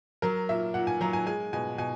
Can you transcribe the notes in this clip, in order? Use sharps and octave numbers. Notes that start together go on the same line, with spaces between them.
F#3 A#4
A#2 E5
A#2 F#5
G#5
F#3 A#5
G#5
G#3 G#5
B2 G#5
B2 G#5